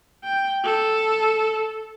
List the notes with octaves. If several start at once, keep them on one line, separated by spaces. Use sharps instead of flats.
G5
A4